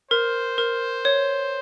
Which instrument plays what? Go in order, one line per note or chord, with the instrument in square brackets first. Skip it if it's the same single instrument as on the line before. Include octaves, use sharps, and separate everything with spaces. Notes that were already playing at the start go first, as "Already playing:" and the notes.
[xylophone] A#4 [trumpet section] C5
[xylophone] A#4
C#5